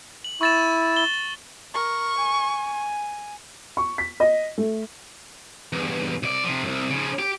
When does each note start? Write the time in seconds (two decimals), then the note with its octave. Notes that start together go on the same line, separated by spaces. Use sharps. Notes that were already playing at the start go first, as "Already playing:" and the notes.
0.24 F#7
0.41 E4 C#6 A6 E7
0.97 G7
1.74 A#4 C#6
2.17 G#5
3.77 C#6
3.98 B6
4.20 D#5
4.58 A3
5.73 E2 G2
6.23 C2 D5
6.44 C3 F3
6.63 C2 F#2
6.90 C#3 F3
7.19 G4